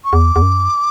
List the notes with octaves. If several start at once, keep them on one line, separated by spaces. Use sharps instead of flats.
C#6
E2 D6
E2
F#2